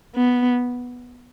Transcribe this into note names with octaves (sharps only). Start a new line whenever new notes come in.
B3